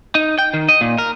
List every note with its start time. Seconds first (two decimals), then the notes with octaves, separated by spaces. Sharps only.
0.15 D#4
0.38 G5
0.54 D#3
0.69 D#5
0.81 A#2
0.98 A#4